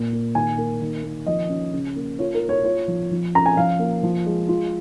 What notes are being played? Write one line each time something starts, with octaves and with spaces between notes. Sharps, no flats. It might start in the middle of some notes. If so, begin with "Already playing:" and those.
Already playing: A#2 A#3
A#3
D#3 G#5
A#3
D#3
A#3
F3 D#5
C#4
C#3
A#3
F4 C#5
A#4
A#3
C#5
F4 C#5
F3
F3
C#4 A#5
G#5
F3 F5
A#3
F3
G#3
F4